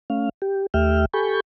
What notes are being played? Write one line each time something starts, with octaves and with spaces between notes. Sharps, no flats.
A3 C#4 F5
G4
D#2 A3 G4 E5 G5 F6
G4 A4 G#5 B5 C#6 G6